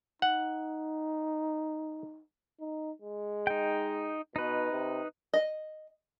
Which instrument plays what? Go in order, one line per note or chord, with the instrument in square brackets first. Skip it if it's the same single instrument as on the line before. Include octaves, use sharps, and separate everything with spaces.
[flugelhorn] D#4 [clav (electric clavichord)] F#5
[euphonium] D#4
G#3
[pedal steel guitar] D#4 G5
[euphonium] B2 [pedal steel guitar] D#4 B4
[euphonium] C3
[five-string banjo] D#5